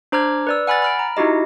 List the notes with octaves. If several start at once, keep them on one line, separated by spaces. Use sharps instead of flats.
D4 C5 A#5 D6 F6 G#6
B4 D5 E6
F#5 G#5 B5 F6 A6
B5 F6 D7
A#5
D#4 E4 F#4 G4 D#5